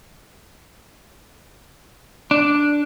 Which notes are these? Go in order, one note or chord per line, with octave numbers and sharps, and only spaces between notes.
D4